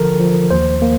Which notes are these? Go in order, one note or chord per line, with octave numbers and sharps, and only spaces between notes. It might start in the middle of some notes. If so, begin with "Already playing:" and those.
Already playing: D3 F3 A4 A#4
F3
D#2 C5
A#3